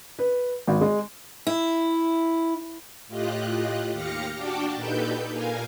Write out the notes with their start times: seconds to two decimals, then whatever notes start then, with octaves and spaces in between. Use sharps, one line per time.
0.19 B4
0.67 G#1
0.81 G#3
1.47 E4
3.08 A2 F4 G4 D#5 F#6
3.92 D#2 G4 F5 F6 A#6 C#7
4.37 D4 F#4 G5 A5 D6
4.75 A#2 D#4 G4 A4 B4 G6
5.32 A#2 A#4 F5 G#5